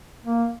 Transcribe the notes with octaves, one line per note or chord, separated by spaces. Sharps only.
A#3